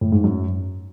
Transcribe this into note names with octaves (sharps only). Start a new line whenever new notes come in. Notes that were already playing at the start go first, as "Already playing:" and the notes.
A2
G#2
F#2